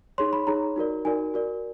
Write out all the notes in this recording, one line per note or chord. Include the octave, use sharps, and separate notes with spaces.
D#4 G#4 C#5 C6
B5
D#4 G#4 C#5 A#5
D#4 F#4 A#4 D5
D#4 F#4 A#4 D5 G#5
F#4 A#4 D5